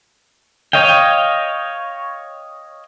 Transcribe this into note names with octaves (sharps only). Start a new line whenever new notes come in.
C#5 D#5 F5 G5